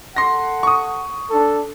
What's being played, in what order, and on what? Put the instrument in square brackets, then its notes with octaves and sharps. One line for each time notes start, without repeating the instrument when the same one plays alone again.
[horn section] A4 F#5 [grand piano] C6 A#6
[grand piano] C#6 D#6
[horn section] D4 A4